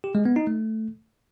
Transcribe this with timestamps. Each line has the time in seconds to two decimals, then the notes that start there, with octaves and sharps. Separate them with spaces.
0.04 G4
0.15 G#3
0.25 B3
0.36 D#4
0.47 A3